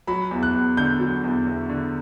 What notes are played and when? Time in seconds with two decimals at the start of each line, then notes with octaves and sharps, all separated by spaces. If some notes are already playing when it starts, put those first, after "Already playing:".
0.07 F#3 B5
0.31 E2
0.43 F#6
0.54 E2
0.77 D3 G6
1.00 F#3
1.24 E2
1.46 E2
1.69 D3